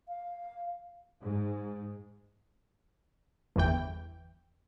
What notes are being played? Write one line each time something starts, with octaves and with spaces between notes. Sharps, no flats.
F5
G#2
G1 E2 E3 G5